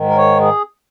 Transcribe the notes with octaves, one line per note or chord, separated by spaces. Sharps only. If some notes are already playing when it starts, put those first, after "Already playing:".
Already playing: G#2 D#3
A#4
C#5
G#4